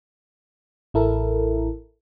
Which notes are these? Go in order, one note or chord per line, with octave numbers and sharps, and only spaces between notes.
A1 E4 A4 A#4